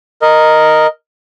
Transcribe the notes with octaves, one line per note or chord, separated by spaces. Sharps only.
A#4 D#5